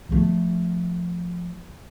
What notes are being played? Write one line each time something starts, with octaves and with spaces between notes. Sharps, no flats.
F3 A3